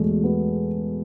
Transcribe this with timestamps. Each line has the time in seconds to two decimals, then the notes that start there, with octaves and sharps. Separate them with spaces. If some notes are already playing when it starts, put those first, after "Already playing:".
Already playing: E2 B2 G#3 A3
0.24 B3